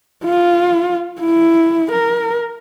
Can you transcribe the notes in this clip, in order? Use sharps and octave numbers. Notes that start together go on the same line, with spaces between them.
F4
E4
A#4